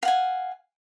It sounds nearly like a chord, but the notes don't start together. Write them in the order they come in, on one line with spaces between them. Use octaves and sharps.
F5 F#5 G#5